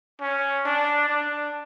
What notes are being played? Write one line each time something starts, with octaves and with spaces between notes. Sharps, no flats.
C#4
D4
D4